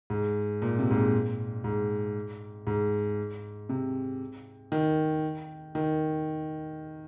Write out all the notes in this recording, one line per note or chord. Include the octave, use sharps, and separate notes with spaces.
G#2
A#2
C3
G#2
A#2
G#2
G#2
C3
D#3
D#3